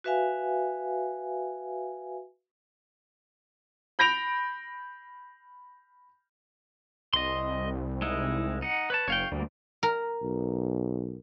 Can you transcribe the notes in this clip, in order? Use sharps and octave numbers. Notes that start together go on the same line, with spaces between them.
F#4 B4 E5 F5 G#5
B5 G6 A#6 D7 F7
C2 D#5 C6
G#3 D#4 E4
D#4 F#5
B4 C#5 A5
F#1 C#5 F5 G5
D2 G3 A#3
A#4
B1